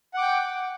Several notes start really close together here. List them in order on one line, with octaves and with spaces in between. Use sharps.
F#5 D6 G5